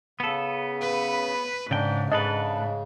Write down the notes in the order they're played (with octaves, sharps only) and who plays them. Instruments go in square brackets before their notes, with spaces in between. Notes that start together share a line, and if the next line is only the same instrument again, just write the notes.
[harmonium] C#3 [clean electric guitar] B3 A4
[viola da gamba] B4
[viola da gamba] G#2 [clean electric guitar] C#3 G5 [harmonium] D4
[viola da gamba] G#2 [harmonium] C#3 [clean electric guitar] D4 A4 B4 [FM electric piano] D#5